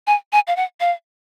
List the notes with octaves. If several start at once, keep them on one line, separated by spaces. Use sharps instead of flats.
G#5
G#5
F5
F#5
F5